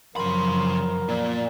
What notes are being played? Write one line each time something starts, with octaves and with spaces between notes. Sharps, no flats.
F#2 C#3 F3 A#4 B5 C6
A#2 D5